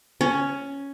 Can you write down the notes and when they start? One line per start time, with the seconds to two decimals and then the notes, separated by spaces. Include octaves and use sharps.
0.21 C#4